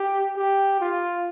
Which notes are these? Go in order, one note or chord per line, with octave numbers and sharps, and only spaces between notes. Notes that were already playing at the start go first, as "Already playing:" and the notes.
Already playing: G4
G4
F4